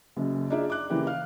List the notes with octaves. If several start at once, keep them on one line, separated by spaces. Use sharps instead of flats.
F#1 F#2 C#3
D4 D#4 F4 G#4 D5 E5
D6 F#6
C#3 E3 A#3 E4 G4
F5 F6